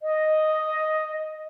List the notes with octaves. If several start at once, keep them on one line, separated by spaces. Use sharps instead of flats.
D#5